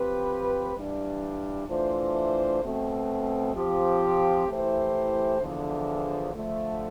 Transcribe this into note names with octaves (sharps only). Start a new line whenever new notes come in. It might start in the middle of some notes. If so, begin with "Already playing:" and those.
Already playing: F3 C4 G4 B4
G2 E3 G3 D4
E3 A3 D4 F4 C5
B2 A3 C4
F3 C4 G4
E3 A3 E4 G4 C5
E2 D3 F3
D3 F3 A3